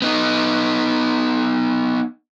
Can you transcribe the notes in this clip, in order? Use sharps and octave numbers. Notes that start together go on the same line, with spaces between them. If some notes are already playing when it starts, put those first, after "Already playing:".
B3 D#4